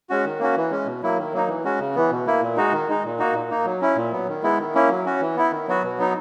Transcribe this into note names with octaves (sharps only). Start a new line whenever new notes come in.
G#3 C#4 F#4
D#3
A#3 C#4 F#4
E3
G#3 C#4
B2
F#3 A#3 E4
D#3
F#3 A#3 D#4
E3
G#3 C#4 F#4
C#3
E3 B3
B2
A#3 E4
A#2
G#3 D#4 F#4
D#3
G#3 D#4
A#2
A#3 D#4 F#4
A#2
A#3 D#4
F#3
C#4 E4
A#2
F#3 B3
D#3
G#3 B3 E4
D#3
A#3 C#4 E4
F#3
C#4 F#4
E3
B3 E4
D#3
F#3 B3 F#4
B2
F#3 B3 D#4